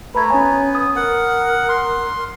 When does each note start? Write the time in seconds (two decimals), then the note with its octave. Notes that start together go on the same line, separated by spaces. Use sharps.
0.15 A3 B4 A#5 B5 G#6
0.30 B3 C#4 C#5 G#5
0.75 D#6
0.96 A#4 F#5
1.69 C6